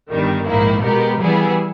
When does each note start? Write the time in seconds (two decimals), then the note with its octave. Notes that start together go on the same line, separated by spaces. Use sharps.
0.11 G1 G2 D#3 G3
0.47 A#1 G#2 D#3 A#3 E4
0.83 B2 G#3 B3 G4 A#4
1.20 E3 G3 B3 E4 G#4